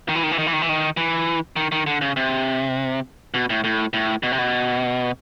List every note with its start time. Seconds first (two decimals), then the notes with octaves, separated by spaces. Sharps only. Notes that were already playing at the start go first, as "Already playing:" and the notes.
0.09 D#3
0.15 E3
0.23 D#3
0.31 E3
0.38 D#3
0.47 E3
0.53 D#3
0.62 E3
0.69 D#3
0.97 E3
1.56 D#3
1.72 D#3
1.87 D3
2.01 C#3
2.16 C3
3.34 B2
3.50 A2
3.64 A2
3.93 A2
4.23 B2
4.32 C3
4.39 B2